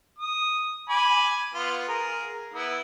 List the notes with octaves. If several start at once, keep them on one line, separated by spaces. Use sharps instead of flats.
D#6
G#5 B5 D6
B3 F4
G#4 A#4
B3 E4